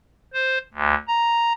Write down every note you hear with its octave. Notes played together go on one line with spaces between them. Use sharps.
C5
D2
A#5